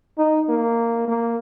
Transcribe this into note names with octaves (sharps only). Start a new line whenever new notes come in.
D#4
A#3
A#3